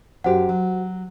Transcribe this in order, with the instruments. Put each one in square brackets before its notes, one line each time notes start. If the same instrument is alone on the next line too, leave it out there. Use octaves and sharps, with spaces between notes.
[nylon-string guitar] F#2 G4 [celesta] F#4 C5 F#5
[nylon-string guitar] F#3